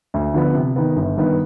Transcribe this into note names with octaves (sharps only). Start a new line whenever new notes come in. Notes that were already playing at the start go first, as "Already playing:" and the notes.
D2
D3 F3 B3
C3
D#3 B3
G1
G2 D#3 B3